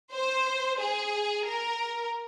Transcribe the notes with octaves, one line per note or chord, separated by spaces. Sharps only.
C5
G#4
A#4